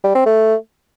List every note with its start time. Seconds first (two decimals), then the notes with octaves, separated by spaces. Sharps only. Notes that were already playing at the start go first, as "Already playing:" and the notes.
0.04 G3
0.15 C4
0.26 A3